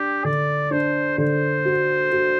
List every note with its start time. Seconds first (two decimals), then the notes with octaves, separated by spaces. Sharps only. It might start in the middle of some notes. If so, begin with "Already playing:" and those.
Already playing: D4 G4
0.24 D3 D5
0.71 D4 C5
1.18 D3 C5
1.65 F#4
2.12 F#4